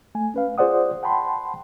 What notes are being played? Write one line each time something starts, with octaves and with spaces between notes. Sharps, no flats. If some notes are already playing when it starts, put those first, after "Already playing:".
A3 G#5
C#4 B4 F5
F4 G#4 C5 D5 F#5 D#6
F#5 G5 A5 B5 C6